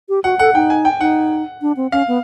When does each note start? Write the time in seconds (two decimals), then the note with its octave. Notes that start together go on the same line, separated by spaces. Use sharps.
0.09 G4
0.24 F#4 F#5
0.39 A4 F#5
0.55 D#4 G5
0.70 G#5
0.85 G5
1.00 D#4 F#5
1.62 D4
1.77 C4
1.92 C#4 F5
2.08 B3